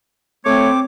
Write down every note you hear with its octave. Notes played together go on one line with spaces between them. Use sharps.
A3 C4 C#5 D6